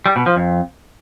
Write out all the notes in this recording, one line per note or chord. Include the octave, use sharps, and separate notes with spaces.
G3
B2
F3
F2